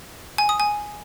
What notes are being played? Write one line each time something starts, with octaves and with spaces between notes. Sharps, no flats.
G#5
D#6
G#5